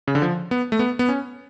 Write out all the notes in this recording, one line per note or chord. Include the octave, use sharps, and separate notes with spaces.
C#3
D3
F3
B3
A3
B3
B3
C#4